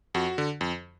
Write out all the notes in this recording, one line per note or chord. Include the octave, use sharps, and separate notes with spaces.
F2 F#4
D3
F2